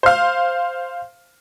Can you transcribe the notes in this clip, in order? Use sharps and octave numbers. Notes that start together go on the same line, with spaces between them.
C5 F5